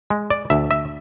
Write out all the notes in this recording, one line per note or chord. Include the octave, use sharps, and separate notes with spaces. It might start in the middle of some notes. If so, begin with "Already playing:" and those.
G#3
D5
D2 E5
E5